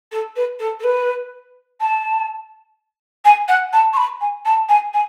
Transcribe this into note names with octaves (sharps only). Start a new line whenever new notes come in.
A4
B4
A4
A4
B4
A5
G#5
F#5
A5
C#6
B5
G#5
A5
G#5
G#5